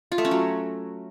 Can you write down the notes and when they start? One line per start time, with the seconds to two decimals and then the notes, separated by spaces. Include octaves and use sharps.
0.12 F4
0.18 A3
0.25 C#4
0.31 F#3